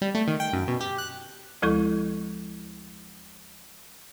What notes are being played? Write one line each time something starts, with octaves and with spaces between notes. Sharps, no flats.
G3
A3
D#3
G5
F#2
B2
G4
F#6
D2 F3 G#3 E4 A4 C#6